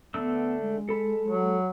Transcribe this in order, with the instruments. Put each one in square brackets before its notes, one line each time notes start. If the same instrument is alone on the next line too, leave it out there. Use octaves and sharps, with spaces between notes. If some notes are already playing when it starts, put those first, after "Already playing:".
[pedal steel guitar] D3 A3 E6 [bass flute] B3
[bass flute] G#3
[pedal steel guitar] A4 B5
[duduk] F#3